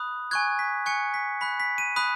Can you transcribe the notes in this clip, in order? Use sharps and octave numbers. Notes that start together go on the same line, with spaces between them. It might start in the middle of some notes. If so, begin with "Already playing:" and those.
Already playing: B5 D#6 F#6
G#5 C#6 F#6 G#6
B6
G#5 C#6 F#6 C#7
B6
B5 F#6 B6
B6
D#7
B5 D#6 F#6